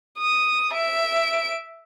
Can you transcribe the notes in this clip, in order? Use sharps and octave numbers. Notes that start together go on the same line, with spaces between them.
D#6
E5 D7